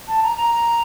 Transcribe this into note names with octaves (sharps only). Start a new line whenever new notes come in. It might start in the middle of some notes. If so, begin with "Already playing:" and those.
A5
A#5
A#5